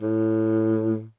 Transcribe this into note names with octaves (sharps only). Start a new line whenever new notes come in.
A2